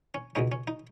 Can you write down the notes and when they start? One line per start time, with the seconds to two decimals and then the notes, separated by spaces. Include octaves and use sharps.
0.14 C#4
0.35 C#2 B2 G#3 C#4 D#4
0.52 C#4
0.67 D#4